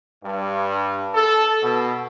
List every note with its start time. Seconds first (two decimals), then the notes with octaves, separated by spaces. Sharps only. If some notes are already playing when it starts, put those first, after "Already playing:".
0.24 G2
1.13 A4
1.63 B2